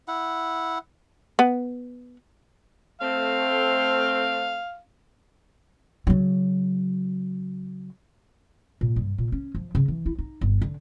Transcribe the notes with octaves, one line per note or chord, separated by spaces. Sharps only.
E4 F#5
B3
A3 C4 F5
C#3 F#3
A#2
G2
A#2
C#4
F3
C#3
E3
E4
D#4
G1
D3